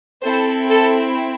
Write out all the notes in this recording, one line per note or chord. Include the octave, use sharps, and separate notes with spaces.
C4 E4 A4 C5
A4